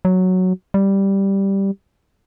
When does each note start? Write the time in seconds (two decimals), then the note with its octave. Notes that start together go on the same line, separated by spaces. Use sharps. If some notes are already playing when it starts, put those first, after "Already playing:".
0.05 F#3
0.74 G3